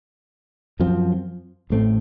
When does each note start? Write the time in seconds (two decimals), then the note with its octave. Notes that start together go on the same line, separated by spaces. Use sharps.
0.80 F#2 F3 C4
1.70 A1 A2 A3 C4